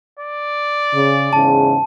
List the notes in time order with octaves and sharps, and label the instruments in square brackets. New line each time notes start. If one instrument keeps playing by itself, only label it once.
[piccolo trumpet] D5
[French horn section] C#3
[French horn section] E2 G#2 C#3 [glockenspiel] A5